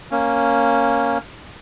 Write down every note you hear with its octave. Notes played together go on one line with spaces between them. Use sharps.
A#3 C#4